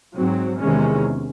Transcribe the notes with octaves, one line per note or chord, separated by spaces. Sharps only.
G#2 F#3 C4
E2 C3 D#3 G#3 C#4